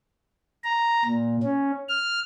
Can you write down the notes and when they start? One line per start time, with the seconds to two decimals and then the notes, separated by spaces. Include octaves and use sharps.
0.64 A#5
1.05 A#2
1.43 C#4
1.88 F6